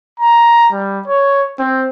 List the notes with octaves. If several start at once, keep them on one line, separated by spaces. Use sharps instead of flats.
A#5
G3
C#5
C4